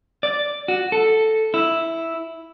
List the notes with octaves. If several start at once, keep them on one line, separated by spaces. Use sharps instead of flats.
D5
F#4
A4
E4